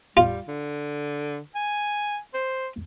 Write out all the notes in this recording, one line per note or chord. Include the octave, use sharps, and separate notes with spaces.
G3 F4
D3
G#5
C5